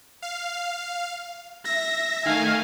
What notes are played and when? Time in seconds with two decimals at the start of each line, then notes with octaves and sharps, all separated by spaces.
0.22 F5
1.65 E5 A#6
2.25 D#3 A3 F5 G#5